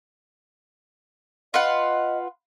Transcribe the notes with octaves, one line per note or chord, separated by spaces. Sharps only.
F4 B4 D#5 F#5